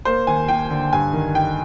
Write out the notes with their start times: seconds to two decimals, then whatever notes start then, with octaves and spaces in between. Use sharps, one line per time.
0.05 A#3 C5
0.27 D#2 G#5
0.48 D#2 G5
0.70 D3
0.93 G2 G#5
1.13 D#3
1.35 D#4 G5